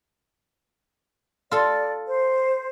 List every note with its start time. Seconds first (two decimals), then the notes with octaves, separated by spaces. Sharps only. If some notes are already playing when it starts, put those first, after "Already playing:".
1.51 F4 A4 D5
2.05 C5